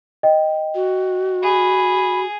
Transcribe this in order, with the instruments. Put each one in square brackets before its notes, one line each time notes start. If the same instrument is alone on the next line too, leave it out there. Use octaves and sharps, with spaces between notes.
[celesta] D#5 G5
[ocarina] F#4
[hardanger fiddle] G#4 [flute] B5